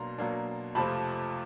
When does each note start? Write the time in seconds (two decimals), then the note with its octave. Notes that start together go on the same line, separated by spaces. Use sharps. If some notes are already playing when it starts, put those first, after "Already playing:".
Already playing: B2 F#3 A#3 D4 A#5 C6
0.18 B2 F#3 A#3 D4
0.75 F2 C3 F3 A3 C4 A5 B5